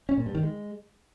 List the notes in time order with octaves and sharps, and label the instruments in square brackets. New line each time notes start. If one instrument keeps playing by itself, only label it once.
[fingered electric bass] C#4
A#2
G2
D#3
G#3